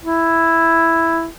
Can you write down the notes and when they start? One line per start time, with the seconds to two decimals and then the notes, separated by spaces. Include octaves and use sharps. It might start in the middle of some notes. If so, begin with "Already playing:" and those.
0.04 E4